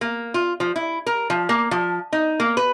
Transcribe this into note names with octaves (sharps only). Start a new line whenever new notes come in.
A#3
F4
F3
E4
A#4
F3
A#3
F3
D#4
A#3
B4